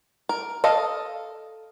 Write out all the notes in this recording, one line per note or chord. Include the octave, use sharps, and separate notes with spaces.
A#4
A4 D#5 F5